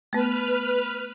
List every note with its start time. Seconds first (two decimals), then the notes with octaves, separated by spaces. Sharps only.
0.13 A3 B3 B4 F6